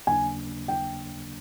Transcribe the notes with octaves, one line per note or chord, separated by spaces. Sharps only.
D#2 C#3 F#3 A#3 D4 G#5
G5